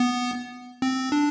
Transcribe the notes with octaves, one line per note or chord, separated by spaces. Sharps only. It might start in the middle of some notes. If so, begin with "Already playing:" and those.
Already playing: B3
C4
D4